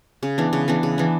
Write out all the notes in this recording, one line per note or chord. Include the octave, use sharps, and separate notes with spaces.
C#3
E3 B3 D4
C#3
E3 B3 D4
C#3
E3 B3 D4